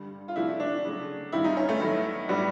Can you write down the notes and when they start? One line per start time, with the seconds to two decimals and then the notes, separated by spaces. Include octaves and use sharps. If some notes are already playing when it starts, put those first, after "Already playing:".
Already playing: G2 D3 G3
0.28 F4
0.36 C3 F3 A3 D4 E4 F#4
0.60 D4
0.85 C#3 F#3 A3
1.32 G2 D#3 G3 C4 E4 F4
1.44 D#4
1.57 C#4
1.69 A3
1.80 D#3 F#3 B3 E4
2.28 A2 F#3 G3 B3 D4 F#4